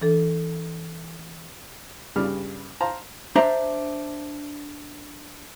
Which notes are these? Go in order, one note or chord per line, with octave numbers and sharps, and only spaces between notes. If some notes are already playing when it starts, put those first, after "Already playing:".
E3 D4 A4
G2 C#3 G3 D5 F6
C5 F5 A5 A#5
D4 C5 E5 A#5